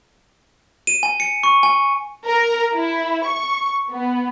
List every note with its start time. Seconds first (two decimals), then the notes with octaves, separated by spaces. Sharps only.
0.87 D#7
1.03 G#5
1.20 C#7
1.43 C#6
1.63 G#5
2.26 A#4
2.74 E4
3.26 C#6
3.91 B3